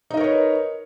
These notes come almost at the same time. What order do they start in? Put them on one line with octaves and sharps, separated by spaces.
D#4 D#5 A#4 C#5 B4